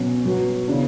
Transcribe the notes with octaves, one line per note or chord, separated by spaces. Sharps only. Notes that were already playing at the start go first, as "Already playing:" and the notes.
Already playing: B2 F#3 C#4
B2 F#3 B3 F#4
C#3 E3 B3 D4